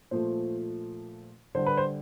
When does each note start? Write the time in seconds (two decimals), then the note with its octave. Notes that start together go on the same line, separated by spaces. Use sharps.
0.11 A#2 F3 A3 C5
1.55 D3 G3 C5
1.66 B4
1.77 C5